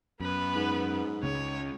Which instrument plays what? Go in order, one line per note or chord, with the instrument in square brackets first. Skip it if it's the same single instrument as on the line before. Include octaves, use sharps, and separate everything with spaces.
[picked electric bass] F#2 [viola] B3 B4
[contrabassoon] G#2
[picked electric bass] C#2 C#3 [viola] C#5